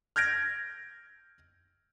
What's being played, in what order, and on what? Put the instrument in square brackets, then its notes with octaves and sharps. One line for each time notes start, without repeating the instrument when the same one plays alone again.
[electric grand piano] F6 G6 G#6 A#6 D7